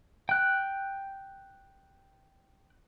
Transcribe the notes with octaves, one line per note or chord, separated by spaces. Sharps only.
G5 F#6